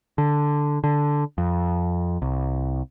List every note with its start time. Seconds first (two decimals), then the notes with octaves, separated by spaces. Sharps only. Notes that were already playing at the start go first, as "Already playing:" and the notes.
0.18 D3
0.84 D3
1.38 F2
2.22 C2